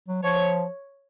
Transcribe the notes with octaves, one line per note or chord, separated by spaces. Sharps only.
F#3
F3 C#5